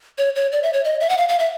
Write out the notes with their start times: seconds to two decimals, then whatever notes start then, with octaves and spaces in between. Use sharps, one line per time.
0.18 C#5
0.36 C#5
0.52 D5
0.63 E5
0.73 C#5
0.85 D#5
1.00 E5
1.09 F#5
1.18 F5
1.29 F5
1.39 E5